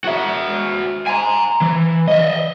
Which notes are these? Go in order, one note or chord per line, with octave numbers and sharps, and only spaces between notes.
F#4 E5
G#5 A#5
E3
D#5 E5